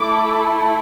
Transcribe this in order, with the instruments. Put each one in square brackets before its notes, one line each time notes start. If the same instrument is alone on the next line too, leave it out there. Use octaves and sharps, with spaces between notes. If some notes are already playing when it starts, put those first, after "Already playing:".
Already playing: [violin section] A3 E4 A4 D6